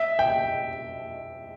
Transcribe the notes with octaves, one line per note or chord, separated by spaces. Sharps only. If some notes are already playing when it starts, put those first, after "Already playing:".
Already playing: E5
G5